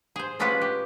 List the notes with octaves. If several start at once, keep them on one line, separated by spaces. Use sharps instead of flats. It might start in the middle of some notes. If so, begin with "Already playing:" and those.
G#4 C5
G#3 C#4 F4 G4 B4 F#5
G4